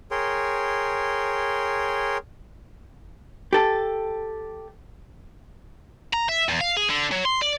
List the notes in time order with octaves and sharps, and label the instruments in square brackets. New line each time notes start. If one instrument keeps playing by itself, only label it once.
[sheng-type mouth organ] G#4 A#4 C#5 G5 C6
[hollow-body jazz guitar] G4 A4
[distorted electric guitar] A#5
E5
E2
F5
G#4
D3
F#3
C6
D5